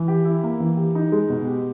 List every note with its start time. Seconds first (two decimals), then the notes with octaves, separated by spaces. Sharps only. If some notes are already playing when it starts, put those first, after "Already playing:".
Already playing: E3
0.08 G4
0.25 E4
0.43 A#3
0.60 E3
0.77 G4
0.95 D#4
1.12 G#3
1.30 B2
1.47 G4